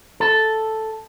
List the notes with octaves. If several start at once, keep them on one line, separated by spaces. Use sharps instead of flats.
A4